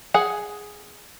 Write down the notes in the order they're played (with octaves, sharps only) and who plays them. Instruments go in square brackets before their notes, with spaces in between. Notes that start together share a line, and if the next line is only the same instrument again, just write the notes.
[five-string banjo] G#4 F#5 G#5